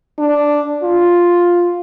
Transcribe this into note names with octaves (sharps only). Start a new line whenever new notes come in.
D4
F4